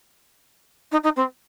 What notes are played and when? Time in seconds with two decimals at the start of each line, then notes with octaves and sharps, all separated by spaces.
0.91 D#4
1.03 D#4
1.16 C4